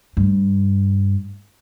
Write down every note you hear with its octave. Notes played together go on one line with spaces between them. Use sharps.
G2